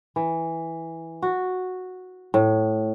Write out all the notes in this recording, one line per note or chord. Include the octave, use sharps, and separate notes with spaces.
E3
F#4
A2